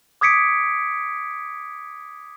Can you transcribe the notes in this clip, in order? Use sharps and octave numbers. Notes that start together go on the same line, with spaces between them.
D6 D#6 G#6 B6 C#7 D7